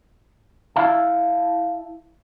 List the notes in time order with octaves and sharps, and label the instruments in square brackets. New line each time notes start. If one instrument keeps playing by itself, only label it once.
[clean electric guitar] E4 E5 F5 A5